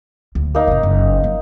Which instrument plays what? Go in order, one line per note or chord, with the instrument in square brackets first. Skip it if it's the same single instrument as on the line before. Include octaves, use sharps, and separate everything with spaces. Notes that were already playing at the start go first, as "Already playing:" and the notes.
[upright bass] D2
[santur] A#3 D#4
[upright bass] F#1 C3
F#1
F3 A#3